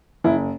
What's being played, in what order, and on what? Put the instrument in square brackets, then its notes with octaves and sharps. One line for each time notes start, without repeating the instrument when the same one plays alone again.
[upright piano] F#1 E4